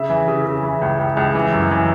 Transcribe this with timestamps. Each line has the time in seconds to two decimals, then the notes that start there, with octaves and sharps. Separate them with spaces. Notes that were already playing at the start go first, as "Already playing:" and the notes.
Already playing: C#3 E5
0.10 E3
0.28 C#3
0.46 C#3
0.63 E3
0.82 C#2
0.99 C#2
1.17 C#2
1.35 E3
1.52 F#2
1.71 E3